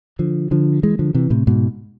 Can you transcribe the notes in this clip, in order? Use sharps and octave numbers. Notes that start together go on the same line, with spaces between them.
D3 F3
D3 F3
E3 G#3
D3 F3
C3 E3
A2 C3
G#2 B2